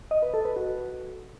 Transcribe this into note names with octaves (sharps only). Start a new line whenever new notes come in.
D#5
B4
A4
B4
F#4